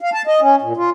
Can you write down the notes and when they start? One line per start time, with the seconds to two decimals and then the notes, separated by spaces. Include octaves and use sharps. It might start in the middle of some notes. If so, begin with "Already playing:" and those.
0.01 F5
0.13 A5
0.27 D#5
0.41 C#4
0.62 A#2
0.77 F4